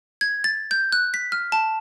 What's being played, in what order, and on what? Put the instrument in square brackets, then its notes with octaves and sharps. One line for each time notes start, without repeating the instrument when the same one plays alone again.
[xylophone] G#6
A6
G6
F#6
B6
F6
A5